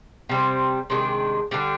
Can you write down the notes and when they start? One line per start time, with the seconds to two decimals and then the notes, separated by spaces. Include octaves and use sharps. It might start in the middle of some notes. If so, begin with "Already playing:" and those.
0.29 C3 G3 C4
0.90 C3 D#3 G#3 D4
1.51 D3 G3 D4